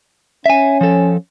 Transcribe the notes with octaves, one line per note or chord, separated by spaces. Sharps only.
C#4 E5 G#5
F3 A4